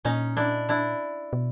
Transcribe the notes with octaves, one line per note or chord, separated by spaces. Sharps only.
A#2 C#4 D#4
D4 E4
D4 E4
B2